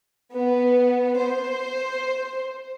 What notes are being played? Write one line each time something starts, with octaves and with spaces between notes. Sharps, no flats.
B3
C5